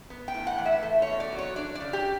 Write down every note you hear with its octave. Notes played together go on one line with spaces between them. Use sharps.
B3
G5
A2
F#5
E3
E5
A3
B2 C#5
D5
F#3
C#5
D4 D5
D5
C#3
G4